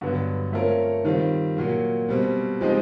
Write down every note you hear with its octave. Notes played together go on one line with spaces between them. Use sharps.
G2 D3 F#3 B3
A3 C4 F4 A#4 C#5
D#3 G3 C4 F4
A#2 F#3 A#3
B2 G3 C4
F3 G#3 C4 D#4 G4